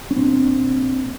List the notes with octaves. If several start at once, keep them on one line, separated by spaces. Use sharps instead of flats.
C#4
A#2 C4 D4
A#2
A#2